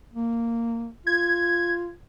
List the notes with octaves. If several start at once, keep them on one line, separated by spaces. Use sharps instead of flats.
A#3
F4 G#6